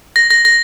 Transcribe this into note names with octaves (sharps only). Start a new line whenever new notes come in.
A#6
A#6
A#6